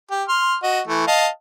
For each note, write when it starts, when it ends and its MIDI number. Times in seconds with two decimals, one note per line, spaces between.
0.11 0.23 67
0.28 0.56 84
0.28 0.56 89
0.63 0.80 66
0.63 0.80 75
0.87 1.03 52
0.87 1.03 57
1.07 1.28 75
1.07 1.28 77
1.07 1.28 81